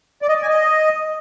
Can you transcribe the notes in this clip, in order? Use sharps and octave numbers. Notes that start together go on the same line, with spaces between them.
D5
D#5
D5
G#5
D#5